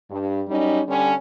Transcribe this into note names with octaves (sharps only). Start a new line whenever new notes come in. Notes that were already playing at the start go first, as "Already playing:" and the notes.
G2
F#2 G3 C#4 D#4
D3 G3 C#4